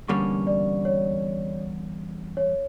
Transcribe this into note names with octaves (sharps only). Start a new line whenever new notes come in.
E2 D3 G3 A#3 C#4 C#6
D5
C#5
C#5